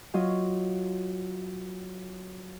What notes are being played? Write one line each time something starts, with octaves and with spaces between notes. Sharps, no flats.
F#3 F4 D#5